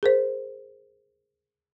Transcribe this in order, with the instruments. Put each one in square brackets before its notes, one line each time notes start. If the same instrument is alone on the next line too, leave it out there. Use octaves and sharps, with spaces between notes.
[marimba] G#4 A#4 C5